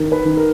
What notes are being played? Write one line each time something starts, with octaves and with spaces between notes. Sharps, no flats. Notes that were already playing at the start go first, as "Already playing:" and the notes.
Already playing: D#3 A#4
B4
D#3
A#4